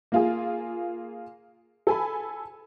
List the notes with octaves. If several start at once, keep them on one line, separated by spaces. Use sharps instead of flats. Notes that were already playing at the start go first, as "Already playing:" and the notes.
A#3 F4 G#4
A4 G#5 B5